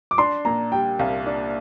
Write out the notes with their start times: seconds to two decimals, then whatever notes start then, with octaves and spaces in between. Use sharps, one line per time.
0.11 D6
0.18 D4 C6
0.45 A#2 A#5
0.72 G3 G5
0.99 C2 F5
1.26 D4